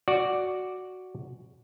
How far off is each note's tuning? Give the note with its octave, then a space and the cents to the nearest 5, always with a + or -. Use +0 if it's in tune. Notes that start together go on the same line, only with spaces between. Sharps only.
F#4 +0 D5 +0